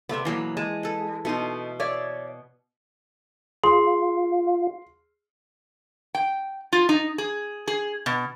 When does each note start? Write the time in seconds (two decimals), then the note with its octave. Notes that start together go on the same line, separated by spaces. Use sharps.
0.09 C3 A3 B3 D5 E5
0.25 B2 E3 F#3 A#3
0.57 G#3 A5
0.83 A4 B4
1.25 B2 A3 D#4 C6
1.80 C#5 D5 E5
3.64 F4 G#4 C6
6.15 G5
6.73 F4
6.89 D#4
7.18 G#4
7.68 G#4
8.06 B2